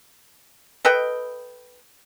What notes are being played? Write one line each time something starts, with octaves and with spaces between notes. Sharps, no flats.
A4 B4 D#5 G5